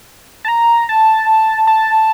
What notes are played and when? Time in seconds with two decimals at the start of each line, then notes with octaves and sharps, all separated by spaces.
0.45 A5
0.48 A#5
0.89 A5
1.67 A5